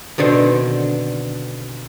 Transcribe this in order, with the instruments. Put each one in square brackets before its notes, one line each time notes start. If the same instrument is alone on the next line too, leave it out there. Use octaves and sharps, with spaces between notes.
[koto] B2 D3 D#3 C4